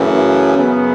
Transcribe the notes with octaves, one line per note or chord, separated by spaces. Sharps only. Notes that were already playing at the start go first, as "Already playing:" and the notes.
Already playing: F#2 C#3 E3 A3
F#2 C#3 F#3 B3